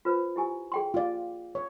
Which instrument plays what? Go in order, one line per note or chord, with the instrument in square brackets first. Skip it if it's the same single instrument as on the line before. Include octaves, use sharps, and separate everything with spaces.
[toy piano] F4 B4 C5
E4 G4 G#5
G#4 G5 C6
[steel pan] F4 D5
C#5